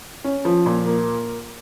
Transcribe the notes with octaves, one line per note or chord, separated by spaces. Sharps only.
C#4
F3
A#2
A#3